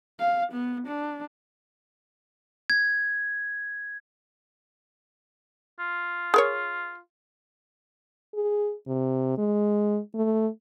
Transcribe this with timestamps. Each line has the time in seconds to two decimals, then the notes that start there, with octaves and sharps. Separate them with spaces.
0.20 F5
0.52 B3
0.87 D4
2.70 G#6
5.79 F4
6.34 G#4 A#4 C#5
8.34 G#4
8.87 C3
9.38 G#3
10.15 A3